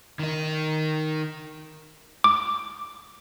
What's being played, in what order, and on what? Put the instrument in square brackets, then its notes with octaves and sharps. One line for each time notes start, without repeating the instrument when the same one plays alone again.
[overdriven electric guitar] D#3 D#4
[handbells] D6